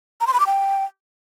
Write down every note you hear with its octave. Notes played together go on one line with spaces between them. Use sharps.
A#5
C6
B5
D6
G5